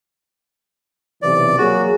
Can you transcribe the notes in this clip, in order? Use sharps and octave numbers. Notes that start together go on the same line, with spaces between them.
B1 C3 E3 D5
F#3 A#3 F#4 G#4